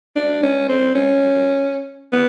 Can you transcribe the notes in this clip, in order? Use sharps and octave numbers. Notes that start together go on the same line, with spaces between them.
D4
C#4
C4
C#4
B3